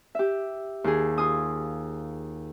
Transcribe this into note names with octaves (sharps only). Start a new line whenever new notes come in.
G4 E5
D#2 G#4
F4 G#5 D#6